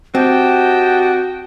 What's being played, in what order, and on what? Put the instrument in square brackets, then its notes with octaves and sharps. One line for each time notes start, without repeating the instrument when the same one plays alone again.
[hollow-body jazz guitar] C4 [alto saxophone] F#4 [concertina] G4 D#5 A5 [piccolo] G5